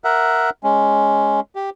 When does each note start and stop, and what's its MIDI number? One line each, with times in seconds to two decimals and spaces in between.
0.04 0.50 70
0.04 0.50 76
0.04 0.50 78
0.64 1.40 56
0.64 1.40 61
1.55 1.70 67